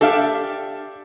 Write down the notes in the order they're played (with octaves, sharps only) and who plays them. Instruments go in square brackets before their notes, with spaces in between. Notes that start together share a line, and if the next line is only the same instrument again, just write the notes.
[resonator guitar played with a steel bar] D4 G4 E5 [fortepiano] A4 F5